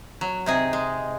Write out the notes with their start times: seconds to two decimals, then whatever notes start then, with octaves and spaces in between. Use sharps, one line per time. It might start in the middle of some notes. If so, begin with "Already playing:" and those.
0.21 F#3
0.46 C3 D#4 G#4
0.73 G#3